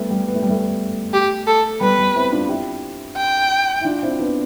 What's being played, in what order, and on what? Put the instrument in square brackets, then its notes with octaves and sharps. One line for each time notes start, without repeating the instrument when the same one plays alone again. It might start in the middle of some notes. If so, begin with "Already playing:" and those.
Already playing: [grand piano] G3 A3 B3
G3
B3
A3
G3
A3
[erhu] G4
A4
[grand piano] G3 B3 [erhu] B4
[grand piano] G3
C4 E4
D4 F4
E4 G4
[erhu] G5
[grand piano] E4
D4 F4
C4 E4
B3 D4